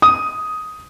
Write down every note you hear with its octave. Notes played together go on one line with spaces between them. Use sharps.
D#6